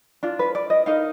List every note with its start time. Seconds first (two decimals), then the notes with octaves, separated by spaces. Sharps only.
0.23 D4 F4
0.39 B4
0.55 D5
0.70 D#5
0.86 D#4 A#4 F5